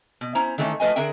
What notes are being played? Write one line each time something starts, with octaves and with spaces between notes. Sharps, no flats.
B2
C#4 E4 C5 A#5
D#3 E3 A3 C#4 D#4
F3 A3 B4 D#5 G#5
D3 G#4 A#4 E5 G5